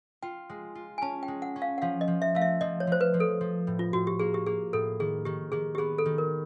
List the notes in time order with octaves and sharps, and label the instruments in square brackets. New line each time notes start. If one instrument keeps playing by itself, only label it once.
[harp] F4 [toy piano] G5
[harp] G#3
F4
[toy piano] G#5
[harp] C#4 [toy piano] A5
[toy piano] G5
[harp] G#3
[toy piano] F#5
[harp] C#4
[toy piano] F5
F#5
[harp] F3 [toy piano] F5
[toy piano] D#5
[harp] F3
[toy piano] E5
[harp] A3 [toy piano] F5
[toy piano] E5
[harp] F3 [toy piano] D#5
[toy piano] C#5
[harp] F3 [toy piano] C5
[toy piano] B4
[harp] F3
[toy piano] A4
[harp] F3
A2
[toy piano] F4
[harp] A2 [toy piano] F#4
[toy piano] G4
[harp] A#3 [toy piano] G#4
[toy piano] G4
[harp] A#3 [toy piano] G#4
[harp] A2 [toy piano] A4
[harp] D#3 [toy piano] G#4
[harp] D#3 [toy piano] G4
[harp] D#3 [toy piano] G#4
[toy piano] G4
[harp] B3 [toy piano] G#4
[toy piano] A4
[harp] D#3
[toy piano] A#4